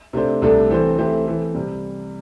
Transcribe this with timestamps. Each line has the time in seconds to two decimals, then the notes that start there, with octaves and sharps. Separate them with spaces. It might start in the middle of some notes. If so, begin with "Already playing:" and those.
0.13 C3 A3 D4 C5
0.42 C2 C3 A3 D4 A4
0.70 E3 C4 A4 C5
0.98 E3 A3 C4 G4 C5
1.26 E3 C4 A4
1.55 C3 G3